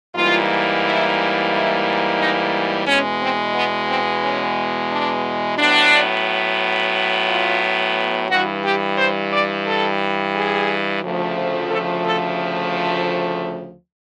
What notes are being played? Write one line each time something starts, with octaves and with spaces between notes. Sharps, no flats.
G#2 E3 G3 A#3 F4
E4
E4
D#4
E2 B2 G#3 C#4
C4
B3
C4
C#4
D4
A2 F#3 B3 D4
F4
G2 E3 G3 F#4
G4
C5
D5
A4
G#4
D2 C#3 F3 A3
A4
A4